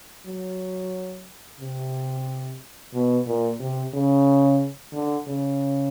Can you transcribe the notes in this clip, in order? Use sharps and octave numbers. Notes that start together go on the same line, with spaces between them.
F#3
C3
B2
A#2
C3
C#3
D3
C#3